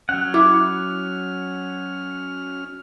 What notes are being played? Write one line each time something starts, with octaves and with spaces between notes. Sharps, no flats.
F#3 C#4 F#5 F6
E4 D6